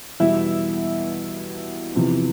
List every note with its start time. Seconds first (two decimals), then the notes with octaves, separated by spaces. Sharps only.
0.20 E2 B2 G3 E4 E5
1.95 E2 C3 F3